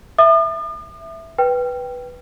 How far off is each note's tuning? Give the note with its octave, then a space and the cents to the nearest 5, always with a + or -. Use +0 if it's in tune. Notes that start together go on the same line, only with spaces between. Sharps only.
E5 +0 D#6 -45
B4 -5 G5 +0